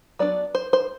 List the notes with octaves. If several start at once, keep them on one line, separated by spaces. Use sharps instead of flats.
F#3 B3 D4 D5
C5
C5